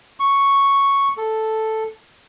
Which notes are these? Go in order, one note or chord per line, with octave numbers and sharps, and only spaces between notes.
C#6
A4